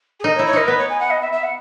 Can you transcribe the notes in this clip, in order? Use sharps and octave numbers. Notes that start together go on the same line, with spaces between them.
G#4
D#4 A#4
C#5
E4
C#5
D#4 A#4
B3 B4
C#5
G#5
F#5
D#5
E5
E5
F#5